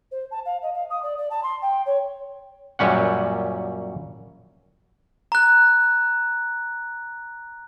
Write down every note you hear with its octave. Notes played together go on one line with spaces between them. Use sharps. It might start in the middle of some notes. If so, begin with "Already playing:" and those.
C5
A5
F5
D#5
F5
D#6
D5
D5
A5
C6
G5
C#5
F#2 A#2 G3 C#4 F#5
A#5 F#6